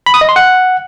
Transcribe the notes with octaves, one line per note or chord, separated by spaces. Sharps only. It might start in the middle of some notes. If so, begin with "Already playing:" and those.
B5
D#6
D#5
C6
F#5